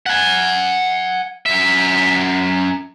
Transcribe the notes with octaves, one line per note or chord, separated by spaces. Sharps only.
F#5 G#5
F#2 E5